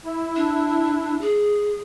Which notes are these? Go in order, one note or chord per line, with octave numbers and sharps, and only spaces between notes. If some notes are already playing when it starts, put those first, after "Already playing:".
E4
D4
G#4